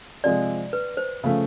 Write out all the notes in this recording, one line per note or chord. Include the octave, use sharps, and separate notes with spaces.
C3 F3 G#3 D5
B4
C5
C#3 F3 A3